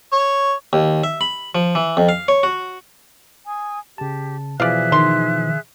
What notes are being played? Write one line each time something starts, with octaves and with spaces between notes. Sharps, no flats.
C#5
D#2
E5
B5
F3
E3
F2
F5
C#5
F#4
G#5 D#6
C#3 G4 A5
B2 E3 F3 G#4 D5 E5 F5 F#6
D#3 C6